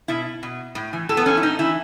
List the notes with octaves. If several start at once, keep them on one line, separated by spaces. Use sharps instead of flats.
B2 E4
B2
A2
E3
A2 A4
B3
E3 C#4
E4
A2 D#4
E3 E4